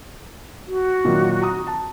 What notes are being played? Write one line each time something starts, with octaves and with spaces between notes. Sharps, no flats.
F#4
A#2 D#3 F#3
A#5 D#6
A5